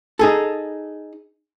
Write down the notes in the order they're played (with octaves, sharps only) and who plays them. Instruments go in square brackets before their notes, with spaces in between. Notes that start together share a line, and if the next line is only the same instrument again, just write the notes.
[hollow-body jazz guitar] D#4 G#4 A4